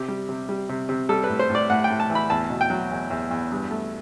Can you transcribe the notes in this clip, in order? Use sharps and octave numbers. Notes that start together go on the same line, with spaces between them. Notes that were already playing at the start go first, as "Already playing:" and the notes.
Already playing: C3 G4
G3
C3
G3
C3
C3
G3 A4
B4
A2
C5
A2
D5
A2 F#5
G5
A2
A5
E3
B5
E2 A5
B2
G5
F#3
E2
E2
E2
G2
A3